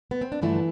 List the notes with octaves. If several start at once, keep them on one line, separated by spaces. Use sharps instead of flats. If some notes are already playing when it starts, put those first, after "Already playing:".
B3
C4
D4
G2 D3 E3 F3 A3 E4